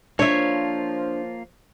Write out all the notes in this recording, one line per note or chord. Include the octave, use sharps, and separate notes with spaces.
F3 A#3 D4 F4 C#5 E5